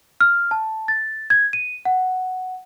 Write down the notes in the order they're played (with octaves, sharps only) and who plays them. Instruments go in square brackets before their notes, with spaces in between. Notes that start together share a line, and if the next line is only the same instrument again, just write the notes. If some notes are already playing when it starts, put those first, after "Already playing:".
[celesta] F6
A5
A6
G#6
D#7
F#5